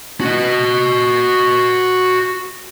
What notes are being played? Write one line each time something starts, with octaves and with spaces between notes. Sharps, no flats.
F#4 D#5